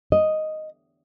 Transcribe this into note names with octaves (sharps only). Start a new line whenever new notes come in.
D#5